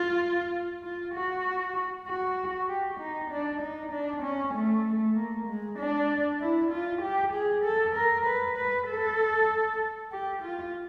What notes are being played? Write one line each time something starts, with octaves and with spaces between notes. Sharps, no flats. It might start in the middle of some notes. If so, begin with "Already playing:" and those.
Already playing: F4
F4
F#4
F#4
G4
D#4
D4
D#4
D4
C#4
A3
A#3
G#3
D4
E4
F4
G4
G#4
A4
A#4
B4
B4
A4
G4
F4